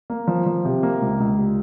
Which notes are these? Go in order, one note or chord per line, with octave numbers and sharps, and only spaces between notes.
A#3
F3
F3
C3
A#3
C#2
C#2
G3